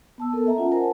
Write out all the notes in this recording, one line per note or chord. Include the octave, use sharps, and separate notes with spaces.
B3 A5 E6
A#3 B3 A4 A#4
D#5 E5 A5 A#5
C#4 F4 F#5 A5
A#4 C5 D#5 F#5 G#5 A5